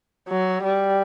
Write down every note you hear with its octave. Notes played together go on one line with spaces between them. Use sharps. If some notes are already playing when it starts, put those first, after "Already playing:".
F#3
G3